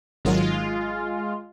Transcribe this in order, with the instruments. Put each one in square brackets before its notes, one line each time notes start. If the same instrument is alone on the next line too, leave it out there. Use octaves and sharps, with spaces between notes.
[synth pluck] G#1 D#3 F#3 [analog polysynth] G#3 F4